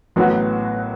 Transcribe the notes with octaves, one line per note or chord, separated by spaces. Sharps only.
A1 A2 F#3 B3 F#4